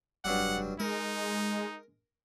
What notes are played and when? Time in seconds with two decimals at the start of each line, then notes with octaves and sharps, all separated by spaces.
0.25 F1 G2 F#3 G3 F#5
0.80 G#3 D#4 A#4